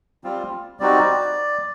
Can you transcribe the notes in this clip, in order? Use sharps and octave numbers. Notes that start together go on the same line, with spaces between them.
G3 C4 F4
G3 C4 D#4 F#4 D5